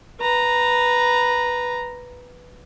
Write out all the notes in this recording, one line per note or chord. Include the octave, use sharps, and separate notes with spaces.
B4 A#5